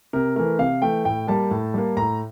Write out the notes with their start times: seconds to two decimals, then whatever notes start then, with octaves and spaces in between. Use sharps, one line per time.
0.13 C3 A#4
0.36 E3 A3 A#4
0.58 C3 F5
0.82 E3 A3 G5
1.05 A2 G5
1.27 G3 A#3 A5
1.51 A2
1.74 G3 A#3
1.97 A2 A#5